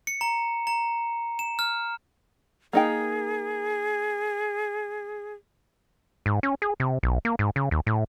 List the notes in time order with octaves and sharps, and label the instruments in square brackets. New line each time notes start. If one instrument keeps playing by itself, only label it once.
[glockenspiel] C#7
A#5
A#5
E7
F6
[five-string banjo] A#3 D#4 G5 [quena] G#4
[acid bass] G#2
C#4
G#4
C3
B1
A#3
G#2
C#3
D#2
A2